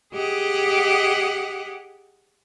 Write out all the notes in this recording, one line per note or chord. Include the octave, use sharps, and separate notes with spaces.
G4 G#4 D#5 F#5